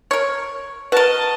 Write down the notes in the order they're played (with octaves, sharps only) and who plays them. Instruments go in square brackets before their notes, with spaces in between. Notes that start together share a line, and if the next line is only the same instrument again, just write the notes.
[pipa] A#4 C#5
[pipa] F#4 A#4 [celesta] B4 [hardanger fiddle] D#5 A5